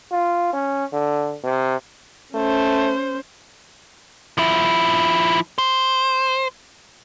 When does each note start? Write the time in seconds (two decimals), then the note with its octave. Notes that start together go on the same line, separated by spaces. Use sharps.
0.12 F4
0.53 C#4
0.93 D3
1.44 C3
2.34 A3 C#4 C5
4.38 F3 E4
5.58 C5